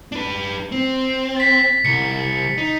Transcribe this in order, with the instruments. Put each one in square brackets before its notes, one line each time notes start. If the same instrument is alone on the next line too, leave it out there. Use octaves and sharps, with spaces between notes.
[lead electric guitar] D4 B4
C4
[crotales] A6 B6
[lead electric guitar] C2 [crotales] C#7
[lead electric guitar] D#4